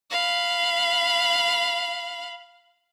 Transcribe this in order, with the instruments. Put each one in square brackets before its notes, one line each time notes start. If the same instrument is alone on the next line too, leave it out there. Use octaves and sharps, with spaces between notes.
[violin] F5 B5